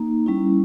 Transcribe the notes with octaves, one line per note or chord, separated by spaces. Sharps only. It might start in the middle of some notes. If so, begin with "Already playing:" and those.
Already playing: A#3 D#4
G3 C#4 E4